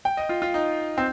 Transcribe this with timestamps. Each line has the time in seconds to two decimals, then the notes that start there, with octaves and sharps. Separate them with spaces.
0.05 G5
0.17 D#5
0.29 F4
0.42 F4
0.54 D#4
0.98 C4